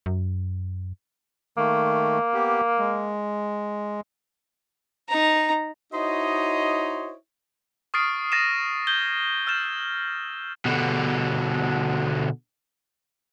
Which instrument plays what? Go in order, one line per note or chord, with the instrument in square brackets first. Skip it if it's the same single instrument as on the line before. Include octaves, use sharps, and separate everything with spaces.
[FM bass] F#2
[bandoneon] D#3 A3 [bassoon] A#3
[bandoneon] B3 G4
G#3
[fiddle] D#4 A#5
[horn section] D#4 E4 F#4 C5 C#5 D#5
[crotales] C#6 D#6 F6 A6 C7 D7
D#6 A6 A#6 C7 D#7 E7
G6 G#6 G7
E6 F6 G6 A6 E7
[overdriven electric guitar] B2 D3